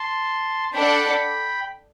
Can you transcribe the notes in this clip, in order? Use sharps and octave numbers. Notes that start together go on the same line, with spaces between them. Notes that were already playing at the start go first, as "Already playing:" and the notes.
Already playing: A5 C6
D4 A4 D5 F#5 G5 B5